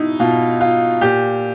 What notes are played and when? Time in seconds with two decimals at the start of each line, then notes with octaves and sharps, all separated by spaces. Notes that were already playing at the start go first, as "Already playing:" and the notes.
Already playing: B2 D#4 E4
0.20 B2 F4
0.61 F4
1.01 A#2 G4